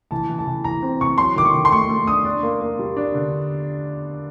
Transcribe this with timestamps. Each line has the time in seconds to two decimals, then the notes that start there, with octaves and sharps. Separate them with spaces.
0.11 E3 A5
0.30 E3
0.39 A5
0.47 E3
0.64 E3 A#5
0.83 C4
1.01 E3 C#6
1.18 F#3 C6
1.36 D#3 D6
1.45 C#6
1.54 D#3
1.65 C6
1.72 A3 C#6
1.89 A3
2.07 D4 D#6
2.25 D4
2.43 A#3
2.61 A#3
2.79 G3
2.97 D4
3.14 D3